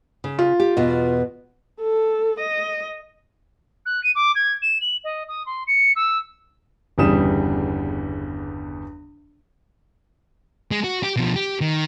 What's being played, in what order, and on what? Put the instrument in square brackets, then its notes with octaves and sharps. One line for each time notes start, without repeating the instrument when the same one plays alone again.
[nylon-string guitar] C#3
[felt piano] F4
[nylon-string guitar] G4
E2 B2 D#5
[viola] A4
D#5
[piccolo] F#6
D#7
D6
G#6
E7
F#7
D#5
D#6
C6
C#7
E6
[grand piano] G1 E2 C#3 G3 D#6 E7
[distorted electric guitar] G#3
F#4
G4
B2 F3
G4
D#3